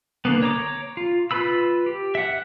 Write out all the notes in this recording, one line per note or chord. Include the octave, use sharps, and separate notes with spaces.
D3 A#3 B3
C#5 A#5 D6
F4
F4 B4 B5 E6
G4
E5 F#5